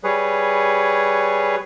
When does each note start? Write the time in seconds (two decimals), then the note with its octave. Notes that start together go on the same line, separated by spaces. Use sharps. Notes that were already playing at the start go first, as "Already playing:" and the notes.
0.04 G3 G#4 B4 C#5